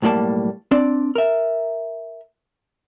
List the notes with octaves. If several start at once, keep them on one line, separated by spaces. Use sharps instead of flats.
B1 A2 G3 A#3 A5
C4 D4 D5
A#4 E5